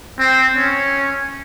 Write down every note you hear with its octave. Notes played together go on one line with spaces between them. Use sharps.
C4
C#4